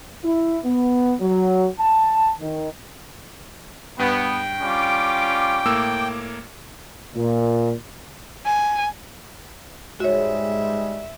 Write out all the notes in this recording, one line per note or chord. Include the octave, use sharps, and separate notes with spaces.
E4
B3
F#3
A5
D#3
G2 B3 G5
G3 C#4 F4 D6
A2 A#3 E6
A#2
G#5
G#2 G3 G#3 F#4 C#5 E5